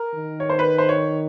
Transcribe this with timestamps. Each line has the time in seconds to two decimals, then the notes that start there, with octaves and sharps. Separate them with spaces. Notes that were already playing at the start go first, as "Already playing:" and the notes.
Already playing: A#4
0.14 D#3
0.40 C#5
0.49 C5
0.59 B4
0.78 C5
0.89 C#5